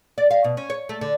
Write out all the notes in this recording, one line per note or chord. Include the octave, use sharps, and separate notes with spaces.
D5
F5
B2
C#4
C#5
A3
D3